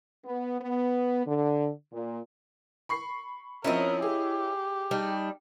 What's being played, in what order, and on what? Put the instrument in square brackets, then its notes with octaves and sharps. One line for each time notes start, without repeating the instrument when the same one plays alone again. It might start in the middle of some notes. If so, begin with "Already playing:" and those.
[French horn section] B3
B3
D3
A#2
[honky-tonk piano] B5 C#6 C7
[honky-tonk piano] F3 C4 C#4 [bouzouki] E4 C#5 D#5 [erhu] A#4
[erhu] G4 [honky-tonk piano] G#4
[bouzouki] G3 D4 D#4